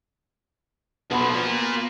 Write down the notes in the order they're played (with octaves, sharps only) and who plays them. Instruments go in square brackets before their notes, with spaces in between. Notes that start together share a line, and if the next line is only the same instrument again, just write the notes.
[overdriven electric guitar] B1 F3 [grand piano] B3 B5
[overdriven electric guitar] A#3 F4